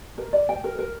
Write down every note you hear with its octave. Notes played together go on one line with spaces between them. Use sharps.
A#4
D5
G5
A#4
A#4